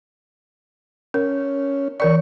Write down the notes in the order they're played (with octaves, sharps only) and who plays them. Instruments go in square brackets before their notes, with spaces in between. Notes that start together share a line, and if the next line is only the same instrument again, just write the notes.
[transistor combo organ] C#4 [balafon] A#4
[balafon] E3 A#4 D5 [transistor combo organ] C#6